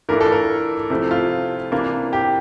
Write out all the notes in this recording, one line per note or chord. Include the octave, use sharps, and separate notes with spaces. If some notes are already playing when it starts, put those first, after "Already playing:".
E3 A3 D4 F4 A#4
A4
A#4
C3 F3 A3 C4 E4
F4
C3 E3 A#3 D4 F4
G4